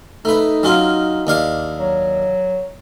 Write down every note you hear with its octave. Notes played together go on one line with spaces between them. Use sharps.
A3 D#4 B4
F#3 C#4 F4
D#2 D4 F5
F#3